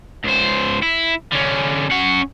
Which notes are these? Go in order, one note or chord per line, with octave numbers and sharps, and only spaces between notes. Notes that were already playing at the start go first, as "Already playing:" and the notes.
C#2 C5
E4
D3 C#4
C#4 F#5